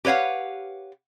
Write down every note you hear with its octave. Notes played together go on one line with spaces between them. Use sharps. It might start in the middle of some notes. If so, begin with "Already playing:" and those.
G4 B4 C#5 F5 F#5